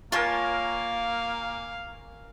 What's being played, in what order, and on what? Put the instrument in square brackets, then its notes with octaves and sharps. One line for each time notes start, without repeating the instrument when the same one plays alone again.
[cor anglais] A#3 [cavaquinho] F4 C#5 A5 [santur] A#4 G#5 C#6 [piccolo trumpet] F5